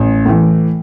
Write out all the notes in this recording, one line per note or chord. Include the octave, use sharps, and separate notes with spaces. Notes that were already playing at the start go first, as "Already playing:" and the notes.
Already playing: A1
A2 E3